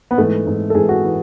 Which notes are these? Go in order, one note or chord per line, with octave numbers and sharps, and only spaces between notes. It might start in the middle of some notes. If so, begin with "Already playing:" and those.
B3
G#2 E3 A3
G#2 E3
A4
G#2 E3 G#4
F#4
E3